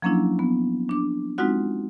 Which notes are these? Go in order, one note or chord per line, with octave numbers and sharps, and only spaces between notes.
F3 F#3 A#3 C#4 D4 E4
B3
D4 D6
G#3 C4 D#4 F4 F#4 F#5